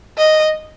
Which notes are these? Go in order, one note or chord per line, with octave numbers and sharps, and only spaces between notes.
D#5